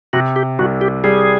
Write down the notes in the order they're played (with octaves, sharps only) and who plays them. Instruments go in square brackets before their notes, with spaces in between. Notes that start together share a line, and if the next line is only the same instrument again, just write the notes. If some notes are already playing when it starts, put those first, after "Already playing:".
[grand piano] C3 [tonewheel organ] F#4
[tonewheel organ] G4
[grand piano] C2 [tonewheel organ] F#4
[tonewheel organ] G4
[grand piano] G3 [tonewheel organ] G#4